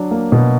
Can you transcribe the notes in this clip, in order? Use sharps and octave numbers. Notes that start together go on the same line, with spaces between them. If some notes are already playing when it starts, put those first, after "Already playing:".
Already playing: F#3 D4
A#3
B2